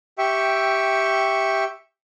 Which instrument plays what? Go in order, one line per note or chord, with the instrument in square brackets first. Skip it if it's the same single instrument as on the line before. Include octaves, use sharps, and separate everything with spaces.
[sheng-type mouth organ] G4 E5 G5 C#6